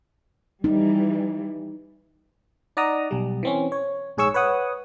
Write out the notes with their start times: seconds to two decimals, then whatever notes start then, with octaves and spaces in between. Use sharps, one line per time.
0.64 E3 G3 D#4
2.77 D#4 D5 F#5 A#5 D#6
3.11 B1 G3
3.43 E3 C4 C#4
3.72 C#5
4.17 A#1 G#2 G#4 C#5 C#6 E6
4.34 B4 C#5 F#5 D#6